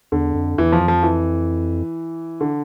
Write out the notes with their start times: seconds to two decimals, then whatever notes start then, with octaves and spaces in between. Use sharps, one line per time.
0.12 E2 D3
0.34 F2
0.58 E2 E3
0.72 F3
0.80 F2
0.88 F3
1.03 E3
2.41 D3